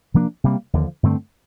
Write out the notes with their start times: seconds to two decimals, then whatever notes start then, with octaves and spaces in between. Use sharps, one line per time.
0.14 C3 F3 A#3 D4
0.44 C3 G3 A#3
0.73 D#2 D3 F3
1.03 G2 D3 A3 C4